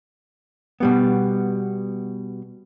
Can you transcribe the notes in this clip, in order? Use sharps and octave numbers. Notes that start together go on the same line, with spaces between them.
B2 G3 B3